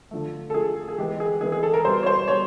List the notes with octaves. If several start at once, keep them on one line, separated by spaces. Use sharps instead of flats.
D3 F3 A3
A4
D3 F3 A3 G#4
G#4
E3 G#3 B3 G4
G#4
E3 G#3 B3 G#4
G#4
A4
A#4
B2 G3 B3 C5
C#5
C5
B2 G3 C#5